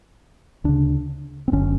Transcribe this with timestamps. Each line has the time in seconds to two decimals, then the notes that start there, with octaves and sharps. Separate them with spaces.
0.64 D2 C#3 D4
1.48 C4
1.52 F#1 F#2 D3 C#4